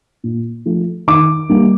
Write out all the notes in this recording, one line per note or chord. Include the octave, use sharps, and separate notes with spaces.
A#2
F3 A3
D#3 D6
G3 A#3